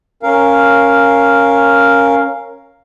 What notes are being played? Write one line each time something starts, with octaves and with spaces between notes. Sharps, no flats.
C#4 A#4 F5